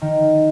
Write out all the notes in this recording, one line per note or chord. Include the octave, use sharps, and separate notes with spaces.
D#3